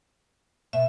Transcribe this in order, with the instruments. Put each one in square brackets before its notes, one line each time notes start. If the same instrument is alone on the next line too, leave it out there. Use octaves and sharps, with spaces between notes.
[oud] B2 [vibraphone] E5